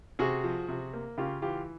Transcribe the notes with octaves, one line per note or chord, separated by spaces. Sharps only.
C3 F#4 G#4
F3
C3
A#3
C#3 F4 G4
E3 F4 G4